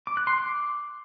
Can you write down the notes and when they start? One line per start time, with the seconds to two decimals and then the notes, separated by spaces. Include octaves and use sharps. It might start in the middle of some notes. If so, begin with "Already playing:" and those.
0.07 D6
0.17 F#6
0.27 C6
0.37 D6